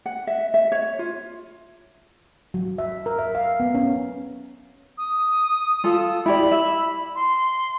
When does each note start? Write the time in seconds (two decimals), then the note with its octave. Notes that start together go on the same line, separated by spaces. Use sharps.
0.06 F#5
0.27 E5
0.54 E5
0.72 C#5
0.99 F4
2.54 F#3
2.78 E5
3.06 A#4
3.19 E5
3.35 F5
3.60 B3
3.75 C#4
4.98 D#6
5.84 F4 A4
6.26 E4 G4 D5 B5
6.51 E5
7.15 C6